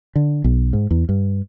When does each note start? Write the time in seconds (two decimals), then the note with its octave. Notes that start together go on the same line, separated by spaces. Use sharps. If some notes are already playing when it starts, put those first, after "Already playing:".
0.16 D3
0.44 B1
0.73 G#2
0.91 E2
1.09 G2